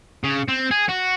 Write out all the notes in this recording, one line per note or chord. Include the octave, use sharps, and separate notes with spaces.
C#3
C4
G#4
F#4